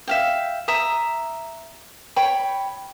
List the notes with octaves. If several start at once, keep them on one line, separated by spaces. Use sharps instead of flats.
E5 F5 G5
E5 A#5 D#6
C#5 G5 B5